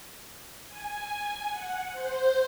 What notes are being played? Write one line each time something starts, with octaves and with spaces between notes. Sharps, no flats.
G#5
F#5
C5